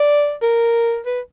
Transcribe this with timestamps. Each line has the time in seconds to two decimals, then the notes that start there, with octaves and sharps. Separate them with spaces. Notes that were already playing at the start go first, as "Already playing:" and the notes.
Already playing: D5
0.42 A#4
1.06 B4